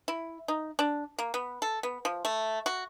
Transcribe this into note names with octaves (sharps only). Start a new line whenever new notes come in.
E4
D#4
D4
A#3
B3
A4
B3
F3
A3
F#4